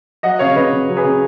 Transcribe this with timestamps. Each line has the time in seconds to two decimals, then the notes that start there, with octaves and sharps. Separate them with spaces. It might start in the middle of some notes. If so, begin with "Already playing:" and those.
0.23 F#3 D#5 F#5
0.39 C#3 C#5 F5
0.56 C#3 B4 D#5
0.72 C#3
0.88 F#3
0.96 G#4 B4
1.04 C#3